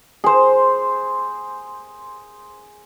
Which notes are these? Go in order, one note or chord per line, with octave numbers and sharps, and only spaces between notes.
G#4 C5